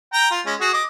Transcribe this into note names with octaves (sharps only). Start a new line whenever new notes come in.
G5 A#5
F4
G#3 C#4
F#4 G#4
D#5 D6